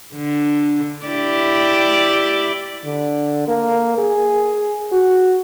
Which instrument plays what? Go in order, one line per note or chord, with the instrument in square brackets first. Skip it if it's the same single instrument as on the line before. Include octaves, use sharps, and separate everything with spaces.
[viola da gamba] D3
E4 G4 D5
[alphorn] D3
A#3
G#4
F#4